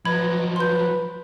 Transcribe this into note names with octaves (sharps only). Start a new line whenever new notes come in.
F3 F#3 B4 D#5 B5 G#6
B4 B5 C6 G6